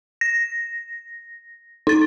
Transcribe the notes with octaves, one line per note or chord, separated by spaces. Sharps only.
A#6
D#4 A6